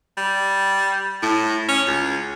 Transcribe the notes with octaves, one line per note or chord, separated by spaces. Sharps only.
G3
A2
C#4
C#2